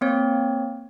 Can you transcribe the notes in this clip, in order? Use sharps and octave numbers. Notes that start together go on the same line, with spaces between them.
A#3 C4 C#5